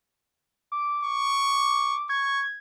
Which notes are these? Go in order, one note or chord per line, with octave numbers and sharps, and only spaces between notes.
D6
C#6
C#6 G#6